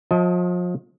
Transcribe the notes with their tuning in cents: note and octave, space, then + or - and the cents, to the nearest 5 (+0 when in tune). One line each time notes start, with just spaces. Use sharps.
F3 +35 D#5 +30 A5 -10